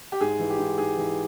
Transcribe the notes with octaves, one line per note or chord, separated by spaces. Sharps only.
G4
G#2 G#4
E3
G4
G#2
G#2 G#4
E3